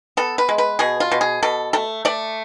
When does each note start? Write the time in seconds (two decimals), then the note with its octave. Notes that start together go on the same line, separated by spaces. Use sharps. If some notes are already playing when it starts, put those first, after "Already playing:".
0.17 B3 A4
0.38 B4
0.49 G#3
0.58 B4
0.79 B2 G#4
1.00 F4
1.12 B2
1.21 G#4
1.43 B2 A4
1.73 A3 A4
2.05 A3 D5